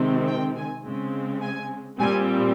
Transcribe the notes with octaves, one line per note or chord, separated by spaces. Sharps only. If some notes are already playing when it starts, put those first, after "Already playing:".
Already playing: C3 D#3 G#3 C4
G5
G#5
C#3 G#3 C4
G#5
A#2 G3 C4 G#5